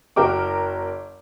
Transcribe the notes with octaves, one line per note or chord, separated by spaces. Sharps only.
F#1 F#4 A#4 G5 D6